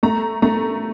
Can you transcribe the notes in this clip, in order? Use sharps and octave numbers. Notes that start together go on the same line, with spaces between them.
A3 A#5
A3 A#5